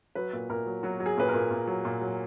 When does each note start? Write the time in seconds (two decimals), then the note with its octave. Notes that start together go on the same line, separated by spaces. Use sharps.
0.15 F#3 B4
0.33 A#2
0.50 A#2 A#4
0.66 F#3
0.83 F#3 F#4
1.00 F#3
1.06 G#4
1.17 A#2 B4
1.29 A#4
1.34 A#2
1.51 A#2
1.67 F#3
1.85 A#2
2.01 F#3